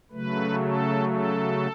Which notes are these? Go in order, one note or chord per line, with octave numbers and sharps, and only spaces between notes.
C#3 F#3 A3 B4
A4
A4